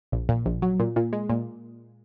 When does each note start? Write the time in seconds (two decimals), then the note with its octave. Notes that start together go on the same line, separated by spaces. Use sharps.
0.12 A#1
0.29 A#2
0.46 A#1
0.62 F#3
0.80 A#2
0.96 A#2
1.13 G#3
1.29 A#2